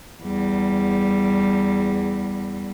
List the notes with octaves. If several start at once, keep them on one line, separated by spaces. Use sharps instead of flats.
E2 G3